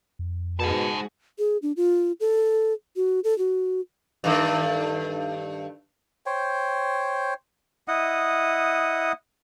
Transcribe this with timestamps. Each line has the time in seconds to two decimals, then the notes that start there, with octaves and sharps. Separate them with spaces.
0.19 F2
0.60 G#2 B2 F#4 G#4 F#5 A5
1.39 G#4
1.62 D4
1.77 F4
2.20 A4
2.96 F#4
3.24 A4
3.38 F#4
4.24 G2 D#3 A3
6.26 C5 C#5 G5
7.88 E4 D#5 F#5 D#6